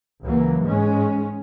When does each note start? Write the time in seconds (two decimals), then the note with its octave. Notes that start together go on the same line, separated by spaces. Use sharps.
0.24 C#2 E3 F#3 A#3
0.63 G#2 G#3 C#4